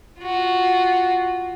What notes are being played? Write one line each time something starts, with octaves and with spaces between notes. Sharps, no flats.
F4 F#4